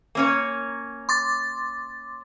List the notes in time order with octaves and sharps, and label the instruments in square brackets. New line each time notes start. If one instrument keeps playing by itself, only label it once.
[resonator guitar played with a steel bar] A#3 C#4 C#5
[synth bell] C6 D6 A6